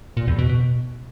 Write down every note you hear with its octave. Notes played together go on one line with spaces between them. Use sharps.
A#2
E2
B2
B2